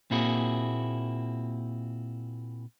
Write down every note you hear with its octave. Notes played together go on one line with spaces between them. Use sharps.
A#2 A#3 C4 E4 F#4 G#4